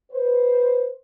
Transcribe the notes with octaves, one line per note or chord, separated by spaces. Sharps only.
B4 C5